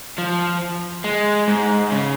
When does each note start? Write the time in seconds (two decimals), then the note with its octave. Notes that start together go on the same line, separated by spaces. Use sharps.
0.18 F3
1.04 G#3
1.48 G#2
1.91 C#3